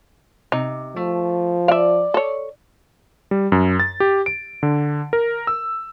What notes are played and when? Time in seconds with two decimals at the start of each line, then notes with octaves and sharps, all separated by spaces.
0.52 C3 D#4
0.96 F3 A3
1.68 D5 E5 F5
2.14 A4 C#5
3.31 G3
3.52 F#2
3.80 A6
4.00 G4
4.26 D7
4.63 D3
5.13 A#4
5.47 E6